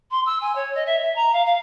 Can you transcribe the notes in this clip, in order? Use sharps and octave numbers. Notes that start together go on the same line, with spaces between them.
C6
E6
G#5
C#5
D#5
E5
E5
A#5
F5
F5